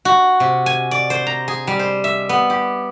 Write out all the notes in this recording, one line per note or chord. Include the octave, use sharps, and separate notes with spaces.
F#4
C3
G#5
D5
C5
A#5
G#4
G3
C5
E5
B3
G4